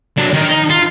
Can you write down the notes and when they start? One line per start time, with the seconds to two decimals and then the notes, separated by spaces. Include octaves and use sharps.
0.17 F#3 D4
0.33 D#3 A#4
0.49 D#4
0.70 F4